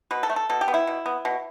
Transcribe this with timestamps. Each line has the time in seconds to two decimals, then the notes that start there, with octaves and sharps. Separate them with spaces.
0.11 B2 B4
0.23 A4
0.29 A3
0.36 A4
0.49 B2 A4
0.61 G4
0.68 B3
0.74 E4
0.87 B2
1.06 B3
1.25 B2